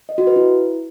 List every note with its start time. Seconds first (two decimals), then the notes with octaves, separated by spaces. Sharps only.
0.09 D#5
0.18 F#4
0.27 B4
0.36 E4